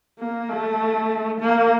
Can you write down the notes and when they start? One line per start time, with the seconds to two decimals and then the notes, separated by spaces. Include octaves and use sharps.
0.19 A#3
0.49 A3
1.40 A#3